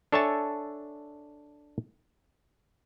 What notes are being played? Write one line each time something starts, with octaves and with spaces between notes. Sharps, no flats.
D4 A4 C#5 E5 G#5 A5